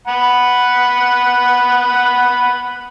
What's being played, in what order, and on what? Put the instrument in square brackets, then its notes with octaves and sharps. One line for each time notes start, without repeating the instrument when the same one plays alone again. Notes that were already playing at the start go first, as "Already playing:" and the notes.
[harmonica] F#5 B5